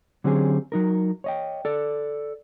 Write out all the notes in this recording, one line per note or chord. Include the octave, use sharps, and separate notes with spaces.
D3 F#3 C4 C#4 G4 G#4
F#3 D#4 A#4
C#5 D#5 G5
A4 D5